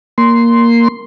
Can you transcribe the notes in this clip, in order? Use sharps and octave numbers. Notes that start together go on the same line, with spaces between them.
A#3 C6